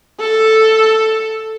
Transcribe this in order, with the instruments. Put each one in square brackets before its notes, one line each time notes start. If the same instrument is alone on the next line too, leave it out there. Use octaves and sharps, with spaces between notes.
[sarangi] A4